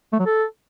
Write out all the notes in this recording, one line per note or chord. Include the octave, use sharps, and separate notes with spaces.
A3
F#3
A4